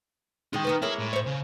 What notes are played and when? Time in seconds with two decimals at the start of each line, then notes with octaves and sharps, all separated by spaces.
0.53 D#3 G#3 D#4 G5
0.65 D#3 B3 B4
0.82 G#3 A#3 E4 C#5
1.00 A2
1.13 C5 C#5
1.27 C#3